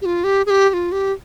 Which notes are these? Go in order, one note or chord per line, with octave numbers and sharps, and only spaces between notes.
G4
F4
G4
G#4
G4
G4
F4
G4